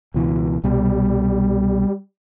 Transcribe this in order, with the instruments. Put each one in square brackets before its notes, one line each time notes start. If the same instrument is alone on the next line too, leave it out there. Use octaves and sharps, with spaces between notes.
[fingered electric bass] C#2 B2 E3
[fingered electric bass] C2 B2 [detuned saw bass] G3